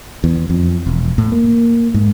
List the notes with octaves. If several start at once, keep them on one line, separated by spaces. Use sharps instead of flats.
E2
F2
E1
A2
A#3
G#2